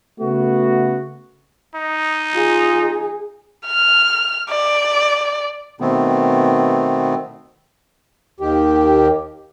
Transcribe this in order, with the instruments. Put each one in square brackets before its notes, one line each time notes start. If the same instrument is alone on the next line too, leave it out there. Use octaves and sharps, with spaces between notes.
[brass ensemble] C#3 A3 B3 F#4
[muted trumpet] D#4
[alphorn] F4 [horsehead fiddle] G#4
[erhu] F6
D5
[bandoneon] B2 D#3 A3 B3 C4
[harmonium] D#2 D#3 G4